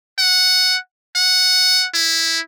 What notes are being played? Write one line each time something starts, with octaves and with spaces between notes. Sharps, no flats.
F#5
F#5
E4